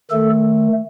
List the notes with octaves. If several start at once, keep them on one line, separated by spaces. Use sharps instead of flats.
D#3 A3 A4